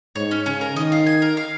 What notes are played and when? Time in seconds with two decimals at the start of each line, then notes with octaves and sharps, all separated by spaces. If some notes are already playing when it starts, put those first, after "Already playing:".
0.15 G#2 C#5
0.31 C#4
0.46 C#3 C#4
0.61 A#4
0.76 D#3 D#5
0.92 F4
1.06 G#5
1.22 A#4
1.37 F5